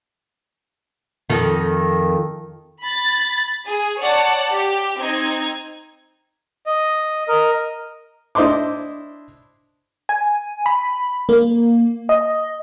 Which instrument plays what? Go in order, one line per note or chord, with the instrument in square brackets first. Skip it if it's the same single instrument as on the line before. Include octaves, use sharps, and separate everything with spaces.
[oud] F2 D#3
[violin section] B5 A6
G#4
C#5 D5 F#5 A5
G4
C4 D#4 G#6
[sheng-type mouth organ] D#5
A#4 D#5
[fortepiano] D4 E4 C5 D#5 C6 D6
[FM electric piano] G#5
B5
A#3
D#5